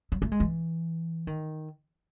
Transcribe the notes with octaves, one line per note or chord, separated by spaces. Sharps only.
F#3
A3
G#3
E3
D#3